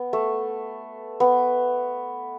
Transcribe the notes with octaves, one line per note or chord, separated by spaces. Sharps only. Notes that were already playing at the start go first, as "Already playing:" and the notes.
Already playing: B3
A3
B3